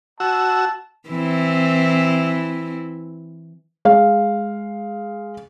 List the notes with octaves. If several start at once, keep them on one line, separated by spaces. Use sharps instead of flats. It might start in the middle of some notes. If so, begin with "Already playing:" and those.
F#4 A5 E6
E3 C4 E4
G#3 F5